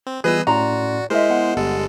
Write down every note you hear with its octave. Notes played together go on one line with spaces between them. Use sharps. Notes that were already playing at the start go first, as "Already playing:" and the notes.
C4
E3 G3 B3 F4 G#4 B4 D#5 E6
A2 C#4 F#4 D5 A#5 C6
G#3 E4 A#4 C5 D#5 E5
B3 G#4 F#5
G1 G#3 G4 A4